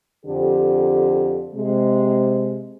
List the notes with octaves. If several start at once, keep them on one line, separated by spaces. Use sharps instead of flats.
F2 D3 G4
C3 G#3